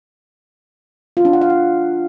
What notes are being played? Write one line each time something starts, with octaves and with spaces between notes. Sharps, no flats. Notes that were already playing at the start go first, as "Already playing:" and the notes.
F4
D4
F#5
F5
F#5